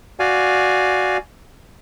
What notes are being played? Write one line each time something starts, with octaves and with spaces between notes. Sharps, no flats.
F#4 D5 F5 G#5